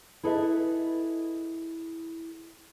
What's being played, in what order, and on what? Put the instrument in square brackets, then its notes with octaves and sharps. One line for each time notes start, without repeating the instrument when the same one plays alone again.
[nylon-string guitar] E4 G#4 A4 B4 D#5 E5